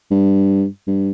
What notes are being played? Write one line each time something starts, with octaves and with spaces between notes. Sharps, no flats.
G2
G2